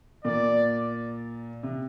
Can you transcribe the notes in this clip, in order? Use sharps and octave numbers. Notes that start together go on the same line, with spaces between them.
A#2 D5
C3